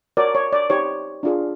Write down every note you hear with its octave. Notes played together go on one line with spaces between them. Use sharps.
F#4 A#4 C#5 D5
C#5
D5
D#4 G4 C5 C#5
D4 F4 G#4